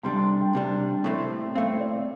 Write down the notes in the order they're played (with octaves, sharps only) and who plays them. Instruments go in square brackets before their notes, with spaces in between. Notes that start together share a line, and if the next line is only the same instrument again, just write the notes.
[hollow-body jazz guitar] C2 C3 G3 D4 [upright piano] C6
[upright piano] C6
G5
[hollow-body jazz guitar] C2 C3 G3 D4
A2 A3 C4
[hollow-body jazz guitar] A2 A3 C4 [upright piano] F5
[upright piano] D5